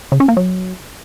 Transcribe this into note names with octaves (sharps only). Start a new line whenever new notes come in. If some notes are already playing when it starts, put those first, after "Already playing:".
C#3
C#4
A#3
F#3